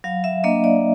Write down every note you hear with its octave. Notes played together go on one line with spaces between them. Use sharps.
F#3 F5
E5
A#3 D4 D#5
D5